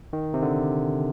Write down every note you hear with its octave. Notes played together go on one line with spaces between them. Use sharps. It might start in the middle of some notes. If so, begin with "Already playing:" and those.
D#3
C3
D3